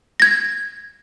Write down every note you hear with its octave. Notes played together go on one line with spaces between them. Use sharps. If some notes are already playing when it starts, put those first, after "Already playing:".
G#6 A#6